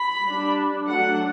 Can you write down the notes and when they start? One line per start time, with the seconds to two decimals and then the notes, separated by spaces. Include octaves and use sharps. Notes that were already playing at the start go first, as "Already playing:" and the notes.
Already playing: B5
0.24 G3 D4
0.85 F#3 A3 D4 F#5